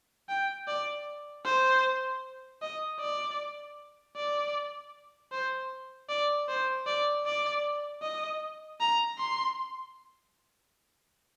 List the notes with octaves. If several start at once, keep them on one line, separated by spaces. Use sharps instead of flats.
G5
D5
C5
D#5
D5
D5
C5
D5
C5
D5
D5
D#5
A#5
C6